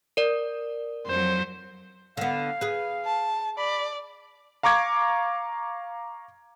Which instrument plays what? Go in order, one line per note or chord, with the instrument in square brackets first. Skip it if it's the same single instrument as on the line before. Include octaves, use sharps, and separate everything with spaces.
[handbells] A#4 D5
[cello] F2 F#3 [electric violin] C5
[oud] D3 B3 [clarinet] F5
[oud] G#4 B4
[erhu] A5
[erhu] D5 [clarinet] B5
[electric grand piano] F5 A#5 C#6 D6 G#6